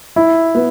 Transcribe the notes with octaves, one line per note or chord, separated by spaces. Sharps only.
E4
B3